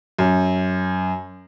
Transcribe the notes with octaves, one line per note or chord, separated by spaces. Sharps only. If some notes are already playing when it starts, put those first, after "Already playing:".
F#2